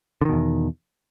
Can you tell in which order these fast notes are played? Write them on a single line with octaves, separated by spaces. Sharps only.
D3 D#3 B2 E2